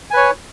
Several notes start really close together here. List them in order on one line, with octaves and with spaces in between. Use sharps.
G#5 B4 C#5